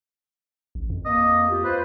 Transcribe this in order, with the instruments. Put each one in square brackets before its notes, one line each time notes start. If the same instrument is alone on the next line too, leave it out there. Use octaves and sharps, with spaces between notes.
[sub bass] A1
F2
[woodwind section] A#3 [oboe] D#5
[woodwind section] F4 G4
[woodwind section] F4 C5 [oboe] B4